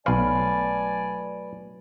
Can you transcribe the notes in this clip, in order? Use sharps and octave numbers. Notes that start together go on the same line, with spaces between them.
B1 F#3 A3 B4 D5 F5 G#5